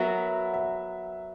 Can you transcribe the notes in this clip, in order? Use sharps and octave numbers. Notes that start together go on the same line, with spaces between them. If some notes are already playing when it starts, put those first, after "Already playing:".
Already playing: F#3 B3 F#4 A#4 E5
E5